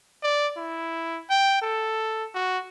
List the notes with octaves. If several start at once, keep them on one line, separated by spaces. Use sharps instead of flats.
D5
E4
G5
A4
F#4